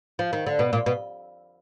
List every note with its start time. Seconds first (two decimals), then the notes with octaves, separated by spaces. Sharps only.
0.19 F3
0.33 D#3
0.46 D3
0.59 B2
0.73 A#2
0.86 B2